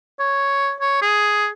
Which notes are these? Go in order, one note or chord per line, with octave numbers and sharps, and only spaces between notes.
C#5
C#5
G#4